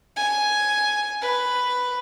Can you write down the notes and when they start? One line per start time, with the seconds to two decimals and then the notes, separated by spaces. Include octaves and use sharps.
0.16 G#5
1.22 B4